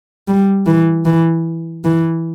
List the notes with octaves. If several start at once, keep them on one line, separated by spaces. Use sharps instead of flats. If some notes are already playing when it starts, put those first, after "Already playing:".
G3
E3
E3
E3